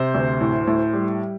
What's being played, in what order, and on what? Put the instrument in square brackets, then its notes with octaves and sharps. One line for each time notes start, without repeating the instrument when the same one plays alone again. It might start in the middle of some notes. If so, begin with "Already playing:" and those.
Already playing: [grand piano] C3 C5
D2
A2
A2
G3